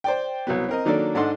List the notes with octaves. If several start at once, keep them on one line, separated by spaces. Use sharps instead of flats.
C5 D5 G5
C2 F#3 B3
C4 A#4 D#5
D#3 F#3 A#3 D4 A4 D5
G#2 D4 A4 D#5 F#5 C6